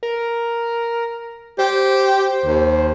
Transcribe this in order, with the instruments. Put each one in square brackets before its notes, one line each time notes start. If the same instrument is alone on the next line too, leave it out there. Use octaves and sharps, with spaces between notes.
[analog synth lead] A#4
[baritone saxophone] G4 [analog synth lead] C5
[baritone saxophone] D#2